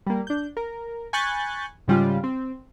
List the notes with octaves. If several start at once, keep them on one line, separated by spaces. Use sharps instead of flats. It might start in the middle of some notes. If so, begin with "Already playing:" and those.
G3 A#3
D4 G6
A#4
G#5 B5 C#6 F#6 G6 A6
G#2 C#3 G3 G#3 F4
C4